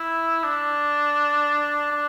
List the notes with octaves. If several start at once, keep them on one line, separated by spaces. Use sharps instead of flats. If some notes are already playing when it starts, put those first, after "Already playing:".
Already playing: E4
D4
D4